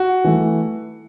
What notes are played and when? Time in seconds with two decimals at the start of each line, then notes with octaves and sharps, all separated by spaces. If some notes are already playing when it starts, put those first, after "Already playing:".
Already playing: F#4
0.24 E3 A3